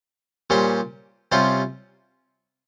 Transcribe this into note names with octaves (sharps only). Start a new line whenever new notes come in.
A#2 G3 C#4 G4 C5
C3 G3 C#4 F4 C5